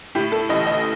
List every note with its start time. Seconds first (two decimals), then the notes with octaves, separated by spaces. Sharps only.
0.15 A2 G4
0.32 A4
0.49 A1 D#5
0.66 D#5